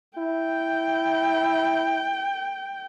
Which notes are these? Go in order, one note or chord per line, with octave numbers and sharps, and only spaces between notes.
E4 G5